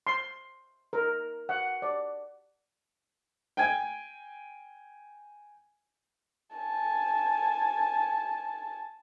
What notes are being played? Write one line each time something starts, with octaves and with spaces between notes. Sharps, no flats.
C6
A#4
F#5
D5
G5 G#5 G#6
G#5 A5